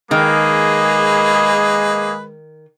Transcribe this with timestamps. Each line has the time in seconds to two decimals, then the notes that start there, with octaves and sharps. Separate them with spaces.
0.11 D#3 G#3 A#3 G#4 B4